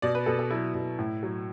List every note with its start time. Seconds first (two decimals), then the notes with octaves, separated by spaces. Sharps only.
0.02 B2 D5
0.15 B4
0.26 B2 A4
0.39 A4
0.51 F#3 E4
0.74 B2
0.98 A2
1.23 F#3